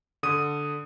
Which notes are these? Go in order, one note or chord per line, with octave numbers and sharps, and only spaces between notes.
D3 D#6 D#7